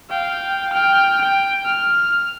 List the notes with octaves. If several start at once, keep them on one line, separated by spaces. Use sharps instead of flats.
F5 G5
G5 F6
G5
F6